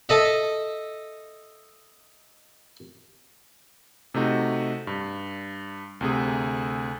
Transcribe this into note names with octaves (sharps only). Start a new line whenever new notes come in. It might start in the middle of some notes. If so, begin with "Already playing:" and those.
A4 D#5 E5
C3 A3 D#4 F#4
G2
D2 C3 G#4